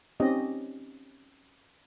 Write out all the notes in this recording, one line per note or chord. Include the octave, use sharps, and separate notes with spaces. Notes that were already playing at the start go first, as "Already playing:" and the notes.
C4 C#4 D#4 G4 D#5